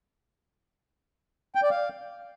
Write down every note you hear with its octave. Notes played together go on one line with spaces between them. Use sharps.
G5
D5
F5